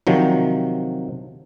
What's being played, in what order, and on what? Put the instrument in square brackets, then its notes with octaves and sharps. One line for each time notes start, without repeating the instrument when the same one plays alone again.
[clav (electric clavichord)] C3 D#3 F3 F#3